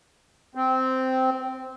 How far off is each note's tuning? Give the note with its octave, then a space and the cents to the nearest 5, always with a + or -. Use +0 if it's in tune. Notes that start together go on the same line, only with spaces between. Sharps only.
C4 -10